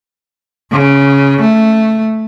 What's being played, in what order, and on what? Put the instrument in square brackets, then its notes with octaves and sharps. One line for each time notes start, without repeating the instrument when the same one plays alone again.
[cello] C#3
A3